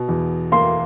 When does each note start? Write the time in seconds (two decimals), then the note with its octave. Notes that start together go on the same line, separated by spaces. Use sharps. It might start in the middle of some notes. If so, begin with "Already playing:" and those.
Already playing: B2
0.09 E2
0.52 A#3 C6